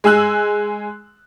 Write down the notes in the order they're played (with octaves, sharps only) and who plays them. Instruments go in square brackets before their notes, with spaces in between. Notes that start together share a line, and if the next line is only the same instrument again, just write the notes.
[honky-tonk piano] G#3 G#5 E6 F#6